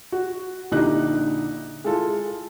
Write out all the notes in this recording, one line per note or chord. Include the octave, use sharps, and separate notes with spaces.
F#4
A#1 D3 D#4 E4 G4 F#6
G#3 E4 F4 A4